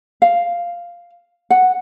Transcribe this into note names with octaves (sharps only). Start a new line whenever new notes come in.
F5
F#5